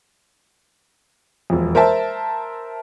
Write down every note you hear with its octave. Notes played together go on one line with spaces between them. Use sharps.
E1 F2
A#4 C5 E5 A5